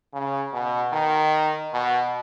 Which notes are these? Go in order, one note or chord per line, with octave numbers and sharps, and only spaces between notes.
C#3
B2
D#3
B2